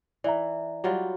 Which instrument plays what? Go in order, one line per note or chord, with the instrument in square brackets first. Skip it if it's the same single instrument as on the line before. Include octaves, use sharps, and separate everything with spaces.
[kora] E3 [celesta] D5 E5 A#5
[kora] F#3 G3 F4